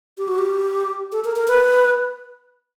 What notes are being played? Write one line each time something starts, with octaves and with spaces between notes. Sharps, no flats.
G4
F#4
G4
A4
A#4
A#4
B4